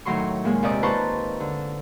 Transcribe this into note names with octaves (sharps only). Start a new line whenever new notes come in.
A2 D#3 F#3 C6 C#6
A#2 G#3 G#5
D#2 C3 D5 D#5 D6
F4 B4 C5 A5 A#5 C#6
D3